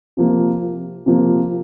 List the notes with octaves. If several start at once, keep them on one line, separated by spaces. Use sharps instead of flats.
C3 F3 A#3
C3 F3 A#3